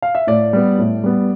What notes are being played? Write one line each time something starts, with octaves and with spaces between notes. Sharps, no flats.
F5
E5
A2 D5
G3 B3
A2
G3 B3